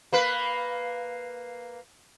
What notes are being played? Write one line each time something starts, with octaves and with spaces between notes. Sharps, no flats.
A#3 B4